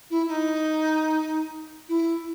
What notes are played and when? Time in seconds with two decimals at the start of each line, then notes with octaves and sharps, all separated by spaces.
0.10 E4
0.28 D#4
1.88 E4